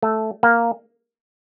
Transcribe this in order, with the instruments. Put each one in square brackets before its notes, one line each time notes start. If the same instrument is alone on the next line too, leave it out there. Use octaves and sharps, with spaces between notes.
[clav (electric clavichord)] A3
A#3